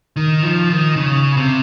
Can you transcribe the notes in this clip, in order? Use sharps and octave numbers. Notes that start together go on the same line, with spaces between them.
D#3
F3
D#3
C#3
C3